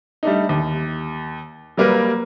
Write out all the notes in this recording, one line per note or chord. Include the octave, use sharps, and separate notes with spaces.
G3 A3 D4 D#4
D#2
F#3 G3 A#3 A#4 B4